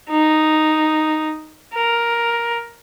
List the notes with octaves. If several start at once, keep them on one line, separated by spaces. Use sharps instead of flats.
D#4
A#4